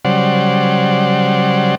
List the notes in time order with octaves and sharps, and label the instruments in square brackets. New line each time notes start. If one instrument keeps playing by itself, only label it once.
[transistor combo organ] C#3 F#3 G3 C5 D5 F#5